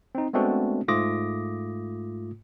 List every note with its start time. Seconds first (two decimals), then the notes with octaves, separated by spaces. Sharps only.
0.15 C4 D#4
0.33 G#3 A3 B3 C4 D4 F#4
0.88 G#2 A3 F4 D6 D#6 A#6